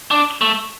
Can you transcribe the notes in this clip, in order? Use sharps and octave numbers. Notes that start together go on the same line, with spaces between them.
D4
A3